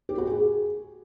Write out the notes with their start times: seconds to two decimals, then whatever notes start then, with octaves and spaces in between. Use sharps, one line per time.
0.09 G4
0.18 F#4
0.27 G#4